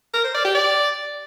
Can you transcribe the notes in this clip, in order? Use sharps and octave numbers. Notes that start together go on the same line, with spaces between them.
A#4
C5
D5
G4
D5